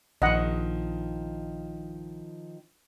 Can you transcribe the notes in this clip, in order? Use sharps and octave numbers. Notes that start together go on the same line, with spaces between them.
A#1 D#3 F3 D#5 F#5